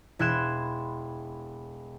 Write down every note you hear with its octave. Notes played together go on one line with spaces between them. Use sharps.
E1 E4 C6 F#6 G#6 E7